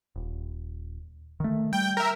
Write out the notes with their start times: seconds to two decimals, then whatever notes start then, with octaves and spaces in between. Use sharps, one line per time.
0.16 D#1
1.40 D#3 A3
1.73 G3 G5
1.97 A#4 E5